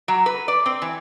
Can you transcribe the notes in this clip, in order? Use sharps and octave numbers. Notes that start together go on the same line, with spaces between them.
F#3
B4
D5
C4
E3